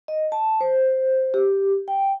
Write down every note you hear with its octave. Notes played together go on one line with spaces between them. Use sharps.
D#5
A5
C5
G4
G5